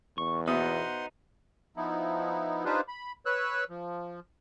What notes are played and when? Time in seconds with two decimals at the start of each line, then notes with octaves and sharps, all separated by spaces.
0.18 E2 C#6
0.48 B2 D#4 B4 C5 E5 F#5 C6 D#6
1.77 F3 B3 D#4 E4
2.65 D4 D#4 F4 G4 B4 C5
2.88 B5
3.26 B4 C#5 E6 F#6
3.70 F3